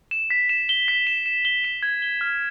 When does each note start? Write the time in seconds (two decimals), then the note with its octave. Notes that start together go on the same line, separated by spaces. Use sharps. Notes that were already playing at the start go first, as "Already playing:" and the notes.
0.11 E7
0.30 B6
0.49 E7
0.69 G7
0.88 B6
1.07 E7
1.26 E7
1.45 G7
1.64 E7
1.83 G#6
2.02 G7
2.21 F6